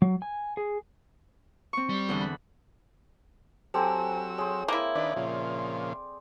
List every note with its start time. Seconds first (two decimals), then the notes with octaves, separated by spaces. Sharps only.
0.02 F#3
0.22 G#5
0.57 G#4
1.73 C4 C#6
1.90 G3
2.09 E2 D3 E3
2.21 B5
3.74 F#3 C4 G4 A4 C5 G#5 A#5 E6
4.38 G#4 C5 C#5
4.68 A#3 E4
4.95 D#3 D4 B4 D5
5.16 A#2 C#3 F3